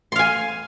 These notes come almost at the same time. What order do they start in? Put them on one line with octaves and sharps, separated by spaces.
C6 F5 G#5